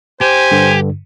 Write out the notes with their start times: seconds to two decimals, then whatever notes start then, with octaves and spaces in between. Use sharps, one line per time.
0.21 G4 C5 G#5
0.51 G2 D3